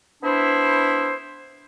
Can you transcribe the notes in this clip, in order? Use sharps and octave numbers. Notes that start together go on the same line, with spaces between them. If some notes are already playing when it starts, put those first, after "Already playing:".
B3 D4 E4 C5